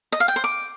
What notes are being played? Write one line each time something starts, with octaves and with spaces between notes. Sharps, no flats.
D#5
F5
G5
C5
D6